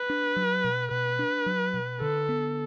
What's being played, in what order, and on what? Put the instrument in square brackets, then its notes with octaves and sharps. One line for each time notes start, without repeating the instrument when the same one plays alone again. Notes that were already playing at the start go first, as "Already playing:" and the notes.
Already playing: [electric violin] B4
[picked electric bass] D4
F#3
B2
[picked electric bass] B2 [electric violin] B4
[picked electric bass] D4
F#3
B2
[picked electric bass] D3 [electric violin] A4
[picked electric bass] B3